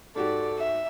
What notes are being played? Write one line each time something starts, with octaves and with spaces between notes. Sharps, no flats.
G#2 F#4 G4 A4 D5
E5